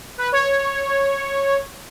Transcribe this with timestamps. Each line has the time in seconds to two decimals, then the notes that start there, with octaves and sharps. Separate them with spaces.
0.18 B4
0.32 C#5